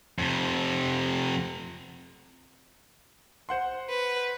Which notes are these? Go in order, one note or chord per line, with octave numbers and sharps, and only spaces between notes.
F2 C3
C5 F#5 C6
B4